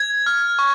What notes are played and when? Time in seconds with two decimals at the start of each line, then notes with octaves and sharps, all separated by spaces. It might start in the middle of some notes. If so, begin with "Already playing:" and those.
Already playing: G#6
0.26 F6
0.59 C#6